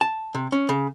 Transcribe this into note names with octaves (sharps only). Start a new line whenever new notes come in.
A5
C3
C#4
C#3